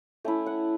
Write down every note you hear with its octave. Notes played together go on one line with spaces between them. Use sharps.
A3 C#4 E4 G5
F#5